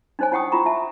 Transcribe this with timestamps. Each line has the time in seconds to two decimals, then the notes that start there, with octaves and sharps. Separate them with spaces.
0.19 D4 D#4 C5 C#5 G#5
0.32 E4 C#5 F#5 G5 C#6 D#6
0.52 E4 F4 A#5 C#6
0.66 E5 A5